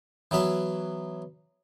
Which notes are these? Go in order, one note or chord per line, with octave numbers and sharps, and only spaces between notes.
E3 F#3 B3 E5